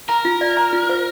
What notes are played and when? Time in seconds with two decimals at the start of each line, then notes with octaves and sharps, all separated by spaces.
0.09 A#4 A#5
0.25 F4
0.41 D5
0.57 A#5
0.73 F4
0.89 C5